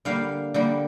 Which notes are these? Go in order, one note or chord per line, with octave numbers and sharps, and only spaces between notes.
D3 G3 A#3 F5
D3 G3 A#3